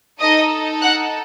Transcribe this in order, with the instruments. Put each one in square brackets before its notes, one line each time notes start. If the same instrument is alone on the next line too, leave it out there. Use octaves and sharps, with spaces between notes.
[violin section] D#4 A4 D#5 D#6
F#5 F#6